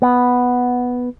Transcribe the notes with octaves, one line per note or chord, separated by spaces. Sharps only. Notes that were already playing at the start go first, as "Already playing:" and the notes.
B3